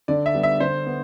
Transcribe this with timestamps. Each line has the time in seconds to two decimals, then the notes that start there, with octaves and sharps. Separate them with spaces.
0.08 D3 D5
0.26 E5
0.35 G3 B3
0.43 E5
0.60 D3 C5
0.86 B3